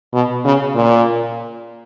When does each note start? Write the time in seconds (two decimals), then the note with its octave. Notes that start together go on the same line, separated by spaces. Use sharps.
0.13 B2
0.45 C#3
0.75 A#2